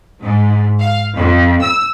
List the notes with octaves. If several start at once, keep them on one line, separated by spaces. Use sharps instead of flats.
G#2
F5
F2
E6